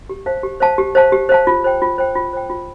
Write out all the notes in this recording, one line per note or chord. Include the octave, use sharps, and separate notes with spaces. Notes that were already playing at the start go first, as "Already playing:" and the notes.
G4
C5 F5 A5
G4
C5 F5 A5
G4
C5 F5 A5
G4
C5 F5 A5
F4
C5 G5
F4
C5 G5
F4
C5 G5
F4